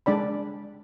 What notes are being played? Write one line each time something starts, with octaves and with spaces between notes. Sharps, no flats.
G#3 D4 D5 B5